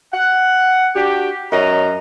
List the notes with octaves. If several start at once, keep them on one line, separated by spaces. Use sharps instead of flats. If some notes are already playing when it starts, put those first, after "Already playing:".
F#5
D4 F#4 G4
F#2 C#5 D#5 A#5